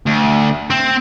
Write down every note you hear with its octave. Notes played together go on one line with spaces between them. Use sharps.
D2
C4